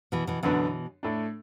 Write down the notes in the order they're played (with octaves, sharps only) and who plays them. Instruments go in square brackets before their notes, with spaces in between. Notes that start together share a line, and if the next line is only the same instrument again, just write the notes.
[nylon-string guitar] B2 E3
B2 E3
[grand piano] F#2 D3 B3 D4 [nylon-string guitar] B2 E3
[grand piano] A2 A3 D4